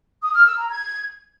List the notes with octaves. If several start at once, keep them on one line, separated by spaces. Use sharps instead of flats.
D#6
F6
E6
A#5
G#6